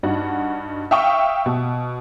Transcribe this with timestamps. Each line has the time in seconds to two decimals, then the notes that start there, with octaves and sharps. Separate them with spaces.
0.03 G2 D#4 F#4 F#5
0.91 E5 F5 G5 C#6 D#6 E6
1.46 B2